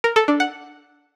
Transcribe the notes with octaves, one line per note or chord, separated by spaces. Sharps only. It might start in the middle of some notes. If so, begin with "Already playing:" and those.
A#4
A4
D4
F#5